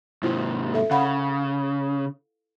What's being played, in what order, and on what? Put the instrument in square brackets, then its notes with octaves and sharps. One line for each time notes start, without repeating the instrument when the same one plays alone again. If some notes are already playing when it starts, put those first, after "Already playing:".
[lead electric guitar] G#2 C3 [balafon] E4 F4 C5
[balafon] A4 E5
[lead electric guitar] C#3 [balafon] F5 F#5 B5